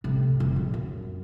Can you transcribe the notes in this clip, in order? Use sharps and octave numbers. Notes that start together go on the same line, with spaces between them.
A2 C3
F1
A#1
F#2